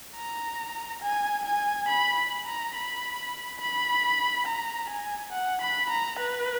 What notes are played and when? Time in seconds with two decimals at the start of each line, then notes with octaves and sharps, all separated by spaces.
0.16 A#5
1.02 G#5
1.45 G#5
1.89 B5
2.17 B5
2.46 A#5
2.75 B5
3.60 B5
4.46 A#5
4.89 G#5
5.32 F#5
5.61 B5
5.90 A#5
6.19 B4